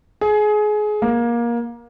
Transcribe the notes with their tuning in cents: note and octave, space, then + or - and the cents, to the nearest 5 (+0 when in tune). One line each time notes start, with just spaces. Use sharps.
G#4 +25
A#3 +20